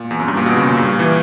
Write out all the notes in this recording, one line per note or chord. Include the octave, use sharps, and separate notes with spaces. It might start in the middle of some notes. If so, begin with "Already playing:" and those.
Already playing: A#2
E2
F#2
G2
A#2
B2
C#3
A#2
G2
A#2
E3